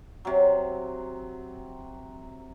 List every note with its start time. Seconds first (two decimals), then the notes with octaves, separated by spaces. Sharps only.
0.25 C3 F#3